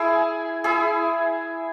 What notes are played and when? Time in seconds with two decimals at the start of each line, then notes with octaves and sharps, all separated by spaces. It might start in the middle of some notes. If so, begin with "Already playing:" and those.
Already playing: E4 G#4
0.64 E4 G#4